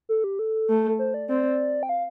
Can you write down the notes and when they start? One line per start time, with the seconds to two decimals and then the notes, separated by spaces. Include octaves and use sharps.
0.09 A4
0.24 G4
0.39 A4
0.69 A3
0.99 C5
1.14 D5
1.29 C4 D5
1.83 G5
1.89 F5